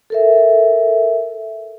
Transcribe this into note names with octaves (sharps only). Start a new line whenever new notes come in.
A4 A#4 E5